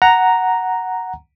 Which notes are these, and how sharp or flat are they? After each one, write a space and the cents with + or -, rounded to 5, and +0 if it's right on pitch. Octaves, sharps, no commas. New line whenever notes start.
F#5 +0 A#5 +0